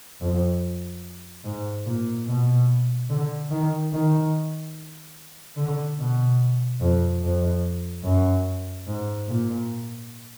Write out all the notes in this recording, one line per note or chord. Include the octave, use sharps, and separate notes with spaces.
F2
G#2
A#2
B2
D3
D#3
D#3
D3
B2
F2
F2
F#2
G#2
A#2